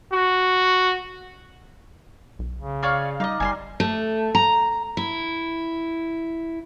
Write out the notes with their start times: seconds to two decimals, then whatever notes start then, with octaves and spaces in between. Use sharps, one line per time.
0.13 F#4
2.39 B1
2.57 C#3
2.83 F4 C#5 D5 F5
3.20 G3 D#4 D5 D#5 F5
3.40 G1 G3 G#5 A5 C6
3.80 A3
4.35 A#5
4.97 E4